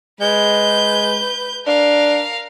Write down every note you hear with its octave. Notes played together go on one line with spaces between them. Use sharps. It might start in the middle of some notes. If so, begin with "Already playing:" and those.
G#3 B4 G6
D4 A#4 F5